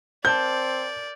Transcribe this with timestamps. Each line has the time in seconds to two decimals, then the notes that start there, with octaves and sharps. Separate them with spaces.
0.25 C4 A#4 D5 A5 G6